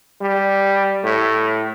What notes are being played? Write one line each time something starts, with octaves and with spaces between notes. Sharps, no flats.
G3
A2